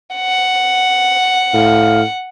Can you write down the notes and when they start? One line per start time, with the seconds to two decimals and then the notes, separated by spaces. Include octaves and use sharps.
0.15 F#5
1.54 A2 F5